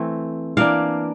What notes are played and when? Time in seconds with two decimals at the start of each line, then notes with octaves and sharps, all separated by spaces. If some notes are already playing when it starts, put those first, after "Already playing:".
Already playing: E3 A3 C4
0.57 E3 A#3 D4 F5